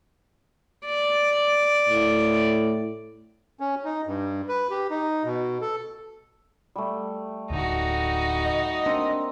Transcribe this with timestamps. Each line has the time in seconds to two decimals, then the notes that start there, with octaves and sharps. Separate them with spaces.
0.86 D5
1.89 A2
3.60 C#4
3.85 D#4
4.06 G2
4.48 B4
4.70 G4
4.90 D#4
5.24 B2
5.61 A4
6.76 G3 A3
7.50 D1 D2 D#4 F#4
8.44 D#5
8.86 A#3 C4 D4